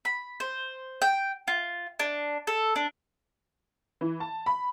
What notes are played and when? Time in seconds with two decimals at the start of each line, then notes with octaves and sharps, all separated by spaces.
0.05 B5
0.40 C5
1.02 G5
1.48 F4
1.99 D4
2.47 A4
2.76 D4
4.01 E3
4.20 A5
4.46 B5